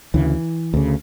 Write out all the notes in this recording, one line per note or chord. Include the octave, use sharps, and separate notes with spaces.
D2 C#3 E3
D2 C#3